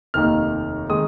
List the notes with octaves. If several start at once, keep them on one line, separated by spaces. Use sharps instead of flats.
F1 D#2 D#3 A#3 D#4 F6
D#3 G#3 D#4 D#6